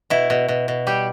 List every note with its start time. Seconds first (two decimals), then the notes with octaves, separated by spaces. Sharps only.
0.10 B2 E4
0.30 B2
0.48 B2
0.68 B2
0.87 G3 G4